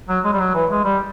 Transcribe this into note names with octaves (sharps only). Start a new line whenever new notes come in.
F#3
G#3
G3
F#3
E3
G#3
G3